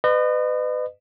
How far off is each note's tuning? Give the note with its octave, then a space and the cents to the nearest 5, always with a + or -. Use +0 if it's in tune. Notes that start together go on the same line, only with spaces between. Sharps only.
B4 +30 D#5 -35